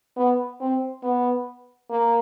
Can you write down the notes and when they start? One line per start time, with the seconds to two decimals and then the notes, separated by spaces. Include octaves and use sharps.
0.17 B3
0.61 C4
1.03 B3
1.90 A#3